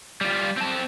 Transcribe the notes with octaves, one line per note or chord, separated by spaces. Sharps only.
G3 F4
C4 A5